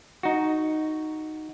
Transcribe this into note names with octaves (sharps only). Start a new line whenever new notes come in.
D#4 F#4